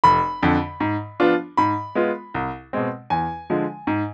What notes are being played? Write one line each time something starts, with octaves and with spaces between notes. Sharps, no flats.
F1 B5
F2 D3
G#2
F3 B3 D4 F4
G#2 B5
G#3 B3 F4
C2
B2 G#3 C4
E2 G#5
D3 F3 G#3
G#2